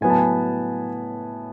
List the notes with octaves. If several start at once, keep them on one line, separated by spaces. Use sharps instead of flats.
A2 F#3 B3 G#5
A5
G#5